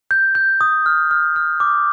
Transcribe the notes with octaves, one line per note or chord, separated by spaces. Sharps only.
G6
G6
D#6
F6
F6
F6
D6